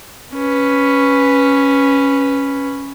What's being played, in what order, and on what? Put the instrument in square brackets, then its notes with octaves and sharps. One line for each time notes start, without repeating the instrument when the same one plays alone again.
[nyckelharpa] C#4 B4